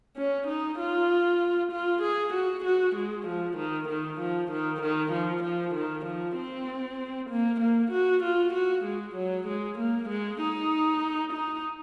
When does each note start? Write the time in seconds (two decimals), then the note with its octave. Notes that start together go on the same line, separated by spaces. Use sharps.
0.17 C#4
0.47 D#4
0.79 F4
1.72 F4
2.02 G#4
2.34 F#4
2.65 F#4
2.96 G#3
3.27 F3
3.57 D#3
3.89 D#3
4.20 F3
4.51 D#3
4.82 D#3
5.12 F3
5.43 F3
5.75 D#3
6.05 F3
6.37 C4
7.30 A#3
7.60 A#3
7.91 F#4
8.24 F4
8.54 F#4
8.85 G#3
9.16 F#3
9.48 G#3
9.79 A#3
10.09 G#3
10.41 D#4
11.33 D#4